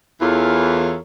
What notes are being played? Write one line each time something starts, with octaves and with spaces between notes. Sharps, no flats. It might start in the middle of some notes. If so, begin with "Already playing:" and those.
E2 E3 F4 A4 A#4 C#5